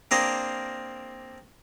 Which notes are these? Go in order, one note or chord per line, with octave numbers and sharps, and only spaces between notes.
A#3 C4 D4 G#4 A#4 C5